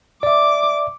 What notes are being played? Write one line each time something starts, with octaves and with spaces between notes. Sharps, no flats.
D5 E5 D6